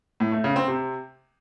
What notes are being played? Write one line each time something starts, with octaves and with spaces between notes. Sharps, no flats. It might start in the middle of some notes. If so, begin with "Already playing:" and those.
A2
A3
C#3
C4
C3